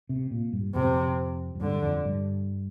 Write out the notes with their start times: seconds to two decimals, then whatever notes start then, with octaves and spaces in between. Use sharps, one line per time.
0.09 C3
0.31 A#2
0.53 G2
0.74 F2 C3
1.55 F2
1.61 G2 D3
1.83 F2
2.05 G2